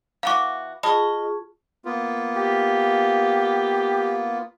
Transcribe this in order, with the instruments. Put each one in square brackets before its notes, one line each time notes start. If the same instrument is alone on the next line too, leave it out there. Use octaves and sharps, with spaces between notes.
[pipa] E3 B3 F#4 [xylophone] F5 D6
[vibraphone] F4 G#4 C#6 [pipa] D#5 [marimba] A5 [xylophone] B5
[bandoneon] A#3 B3 F4
[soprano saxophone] G4